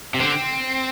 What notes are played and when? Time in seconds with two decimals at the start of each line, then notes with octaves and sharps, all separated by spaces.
0.14 C3
0.20 D3 C4